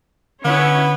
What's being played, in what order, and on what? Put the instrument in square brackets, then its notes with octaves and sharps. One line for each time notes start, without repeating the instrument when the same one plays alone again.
[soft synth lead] D3 [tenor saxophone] B3 [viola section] C#4 E4 C#5